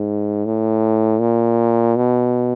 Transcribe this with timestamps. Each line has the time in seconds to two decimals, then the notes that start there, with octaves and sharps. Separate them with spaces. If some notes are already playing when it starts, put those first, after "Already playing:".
Already playing: G#2
0.45 A2
1.20 A#2
1.96 B2